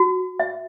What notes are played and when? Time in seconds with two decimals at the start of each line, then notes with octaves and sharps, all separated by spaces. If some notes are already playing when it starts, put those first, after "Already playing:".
Already playing: F#4
0.40 E5